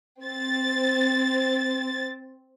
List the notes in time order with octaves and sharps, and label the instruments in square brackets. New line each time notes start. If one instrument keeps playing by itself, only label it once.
[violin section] C4 A6